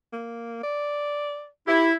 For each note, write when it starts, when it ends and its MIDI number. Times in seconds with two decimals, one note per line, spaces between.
0.13 0.60 58
0.63 1.48 74
1.67 1.93 64
1.67 1.89 67